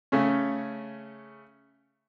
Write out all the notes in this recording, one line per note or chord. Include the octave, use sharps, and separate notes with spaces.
C#3 A3 C#4